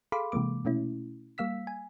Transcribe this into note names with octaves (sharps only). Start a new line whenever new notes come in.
G#4 A4 F5 B5 C6 D6
C3 E3 G#3 A#3 D6
B2 A3 C#4 E4
G3 A#3 F5 E6 B6
G#5